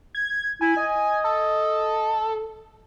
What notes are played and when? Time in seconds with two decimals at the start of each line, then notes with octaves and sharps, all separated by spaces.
0.15 G#6
0.61 E4 G#5
0.77 D#5
1.24 A4